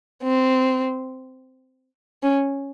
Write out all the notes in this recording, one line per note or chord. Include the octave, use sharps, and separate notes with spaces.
C4
C#4